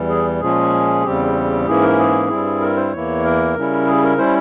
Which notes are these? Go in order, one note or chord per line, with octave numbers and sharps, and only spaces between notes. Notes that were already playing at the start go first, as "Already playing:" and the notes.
Already playing: E2 E3 G3
G#4
A#2 F3 G#3 C#4 G#4
E2 C#3 G3 C4 G4
G#2 E3 A#3 C#4 E4 G#4
A#4
G#4
G2 G3 C4 E4
A#4
C5
E2 E3 A#3 E4 C#5
A#4
C#3 G3 C#4 E4
G#4
A#4
G3 C#4 E4 C5